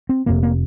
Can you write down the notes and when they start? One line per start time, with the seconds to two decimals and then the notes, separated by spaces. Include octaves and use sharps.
0.09 C4
0.26 F1 F2 C3 A#3
0.43 A#3